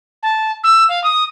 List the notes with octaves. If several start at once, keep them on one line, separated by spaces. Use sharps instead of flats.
A5
E6
F5
D#6